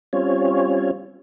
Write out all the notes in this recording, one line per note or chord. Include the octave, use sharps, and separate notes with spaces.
G3 C4 C#4 F4 C#5